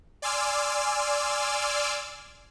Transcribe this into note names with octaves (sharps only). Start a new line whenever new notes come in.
D5 G#5 C6 D6 E6 F6